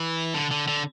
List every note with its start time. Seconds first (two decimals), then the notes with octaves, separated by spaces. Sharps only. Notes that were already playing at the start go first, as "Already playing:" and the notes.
Already playing: E3
0.34 D3
0.51 D3
0.68 D3